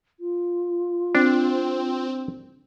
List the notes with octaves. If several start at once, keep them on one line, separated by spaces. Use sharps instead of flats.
F4
C4 D4